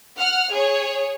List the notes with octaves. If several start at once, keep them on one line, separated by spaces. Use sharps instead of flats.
F#5 F6
G#4 C#5